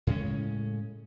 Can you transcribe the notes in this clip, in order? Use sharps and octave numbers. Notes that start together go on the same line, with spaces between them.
A2 C#3 G#3 C#4